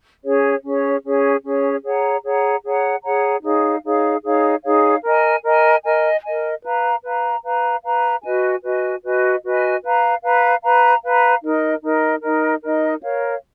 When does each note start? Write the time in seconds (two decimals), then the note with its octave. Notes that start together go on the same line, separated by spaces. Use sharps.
0.24 C#4 G#4 C#5
0.64 C#4 G#4 C#5
1.04 C#4 G#4 C#5
1.44 C#4 G#4 C#5
1.84 G#4 C#5 F#5 A#5
2.24 G#4 C#5 F#5 A#5
2.64 G#4 C#5 F#5 A#5
3.03 G#4 C#5 F#5 A#5
3.44 D#4 G#4 C#5 F5
3.84 D#4 G#4 C#5 F5
4.23 D#4 G#4 C#5 F5
4.64 D#4 G#4 C#5 F5
5.03 A#4 D#5 G#5
5.43 A#4 D#5 G#5
5.84 A#4 D#5 G#5
6.24 A#4 D#5 G#5
6.63 B4 F5 A#5
7.04 B4 F5 A#5
7.44 B4 F5 A#5
7.83 B4 F5 A#5
8.23 F#4 B4 D#5 G#5
8.63 F#4 B4 D#5 G#5
9.03 F#4 B4 D#5 G#5
9.43 F#4 B4 D#5 G#5
9.83 B4 F5 A#5
10.23 B4 F5 A#5
10.63 B4 F5 A#5
11.03 B4 F5 A#5
11.43 D#4 A#4 D#5
11.83 D#4 A#4 D#5
12.23 D#4 A#4 D#5
12.63 D#4 A#4 D#5
13.02 A#4 C#5 F5